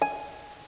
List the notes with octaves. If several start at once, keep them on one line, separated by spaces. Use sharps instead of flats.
G#5